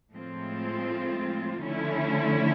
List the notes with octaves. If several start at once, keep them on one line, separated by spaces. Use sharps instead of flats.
A2 F3 G#3 C4 F4
D3 F3 A3 C#4 E4